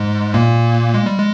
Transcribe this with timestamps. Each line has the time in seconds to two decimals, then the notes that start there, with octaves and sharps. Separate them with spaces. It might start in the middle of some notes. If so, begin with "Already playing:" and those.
Already playing: G#2 G#3
0.34 A#2 A#3
0.94 G#3
1.06 G3
1.19 G#3